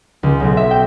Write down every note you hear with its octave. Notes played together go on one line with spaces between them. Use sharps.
C#2
B1
E5
G5